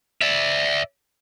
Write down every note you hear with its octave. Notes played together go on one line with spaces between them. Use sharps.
D5 E5